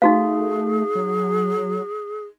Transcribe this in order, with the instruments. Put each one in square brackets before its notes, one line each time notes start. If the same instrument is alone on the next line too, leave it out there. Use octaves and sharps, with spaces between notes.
[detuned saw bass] A3 [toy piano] D#4 F#4 F5 [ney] G#4
[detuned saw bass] F#3